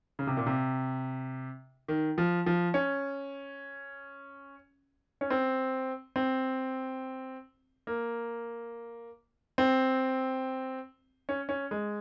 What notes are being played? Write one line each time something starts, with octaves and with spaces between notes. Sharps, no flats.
C#3
C3
A#2
C3
D#3
F3
F3
C#4
C#4
C4
C4
A#3
C4
C#4
C#4
G#3